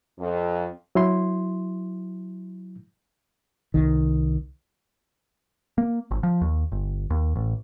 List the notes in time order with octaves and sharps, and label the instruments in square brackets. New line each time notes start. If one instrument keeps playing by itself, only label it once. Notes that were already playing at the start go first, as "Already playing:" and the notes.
[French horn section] F2
[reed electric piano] F#3 E4 C6
[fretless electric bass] C2 D#3
[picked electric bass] A#3
G#1
F3
D#2
G1
D#2
A1